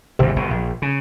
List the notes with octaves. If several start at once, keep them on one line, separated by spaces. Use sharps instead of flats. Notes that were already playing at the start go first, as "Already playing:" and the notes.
G#1 E2 C3
G1 B2
A#1
C#3